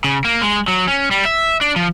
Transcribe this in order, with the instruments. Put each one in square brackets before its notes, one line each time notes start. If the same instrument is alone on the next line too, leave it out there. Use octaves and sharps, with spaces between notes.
[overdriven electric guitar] C#3
A#3
G#3
F#3
C#4
G3
E5
D4
F3